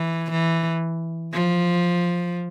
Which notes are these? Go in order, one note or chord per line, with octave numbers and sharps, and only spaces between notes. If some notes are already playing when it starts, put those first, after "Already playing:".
Already playing: E3
E3
F3